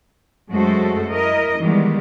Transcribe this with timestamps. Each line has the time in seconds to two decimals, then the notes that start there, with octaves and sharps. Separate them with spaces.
0.51 F#2 G#3 A3 F#4 A4 C5
1.12 E4 A#4 D#5
1.59 D#3 E3 G3 G#3 B3